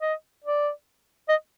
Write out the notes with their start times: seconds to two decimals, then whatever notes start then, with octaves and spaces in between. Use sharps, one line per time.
0.01 D#5
0.44 D5
1.29 D#5